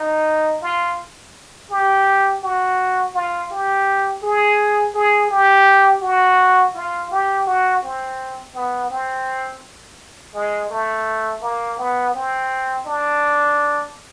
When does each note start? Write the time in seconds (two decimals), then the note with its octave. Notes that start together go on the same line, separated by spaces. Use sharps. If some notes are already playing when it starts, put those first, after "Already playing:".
Already playing: D#4
0.62 F4
1.71 G4
2.43 F#4
3.15 F4
3.51 G4
4.23 G#4
4.95 G#4
5.31 G4
6.02 F#4
6.75 F4
7.11 G4
7.47 F#4
7.83 C4
8.55 B3
8.91 C4
10.35 G#3
10.70 A3
11.42 A#3
11.78 B3
12.15 C4
12.86 D4